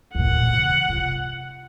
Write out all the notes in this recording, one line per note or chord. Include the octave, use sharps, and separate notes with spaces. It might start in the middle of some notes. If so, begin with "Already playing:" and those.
D#2 A#2 F#5
C#3 E3
C3 F4